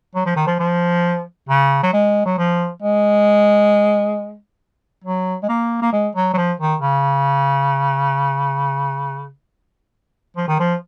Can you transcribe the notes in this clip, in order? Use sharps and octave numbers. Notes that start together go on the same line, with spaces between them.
F#3
F3
D#3
F3
F3
C#3
F#3
G#3
F#3
F3
G#3
F#3
G#3
A#3
A#3
G#3
F#3
F#3
F3
D#3
C#3
F3
D#3
F3